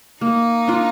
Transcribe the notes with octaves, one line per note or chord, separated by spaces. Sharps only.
A#3 D#4
D4 F4